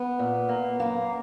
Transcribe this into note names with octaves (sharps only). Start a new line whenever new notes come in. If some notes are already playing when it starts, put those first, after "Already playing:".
Already playing: B3
A#2
A#3
F#2 A#3